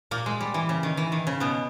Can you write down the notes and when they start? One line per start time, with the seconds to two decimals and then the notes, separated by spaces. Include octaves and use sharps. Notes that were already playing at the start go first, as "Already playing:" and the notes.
0.11 A#2 A#3
0.26 G#3
0.41 G3
0.54 E3
0.69 C#3
0.83 D#3
0.97 E3
1.12 D#3
1.27 C#3
1.40 B2 B3